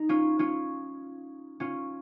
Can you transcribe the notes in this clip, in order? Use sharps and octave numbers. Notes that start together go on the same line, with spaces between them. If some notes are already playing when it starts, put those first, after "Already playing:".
Already playing: D#4
C#4 F4
C#4 F4
C#4 F4